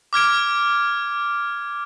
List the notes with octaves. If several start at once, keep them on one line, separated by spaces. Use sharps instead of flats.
D6 F6 G#6 D7